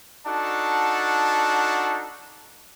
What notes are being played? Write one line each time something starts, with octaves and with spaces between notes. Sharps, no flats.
D4 D#4 F#4 A4 F#5 A5